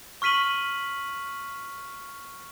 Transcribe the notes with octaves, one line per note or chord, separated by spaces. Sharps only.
C#6 F6 B6 D#7 F#7